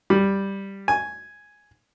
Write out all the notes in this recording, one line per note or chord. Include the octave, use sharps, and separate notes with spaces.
G3
G#5